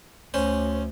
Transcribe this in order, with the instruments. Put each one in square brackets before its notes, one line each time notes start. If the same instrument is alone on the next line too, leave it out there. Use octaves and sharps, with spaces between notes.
[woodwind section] D2 [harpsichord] C#4 C5